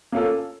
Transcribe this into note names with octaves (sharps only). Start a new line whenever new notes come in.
A#3 C#4 F4 A4